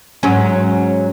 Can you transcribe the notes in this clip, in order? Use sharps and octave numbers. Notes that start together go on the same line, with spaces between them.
G#2 F#3 C#4